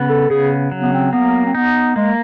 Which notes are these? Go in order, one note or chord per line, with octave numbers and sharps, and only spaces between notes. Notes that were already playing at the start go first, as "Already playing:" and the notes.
Already playing: C#3 B3
A4
C#3 G#4
F#3
B3
C4
A#3 B3
C4
B3 D#4
G#3 A#3